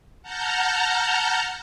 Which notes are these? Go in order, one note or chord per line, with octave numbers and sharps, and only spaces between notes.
F#5 A5 A#5 F6 G6